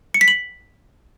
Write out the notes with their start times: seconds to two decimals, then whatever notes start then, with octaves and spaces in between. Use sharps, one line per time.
0.14 C#7
0.21 B6
0.28 F#7